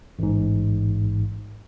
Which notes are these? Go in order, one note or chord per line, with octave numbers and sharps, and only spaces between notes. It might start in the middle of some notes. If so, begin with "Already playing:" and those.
A1 G#2